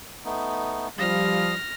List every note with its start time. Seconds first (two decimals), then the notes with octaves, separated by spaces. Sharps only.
0.25 A3 B3 D#4
0.99 F3 G3 F5 D#6 F6 A#6